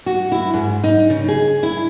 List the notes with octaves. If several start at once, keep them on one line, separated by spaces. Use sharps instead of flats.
F#4
E4
G#2
D#4
C#3
G#4
E4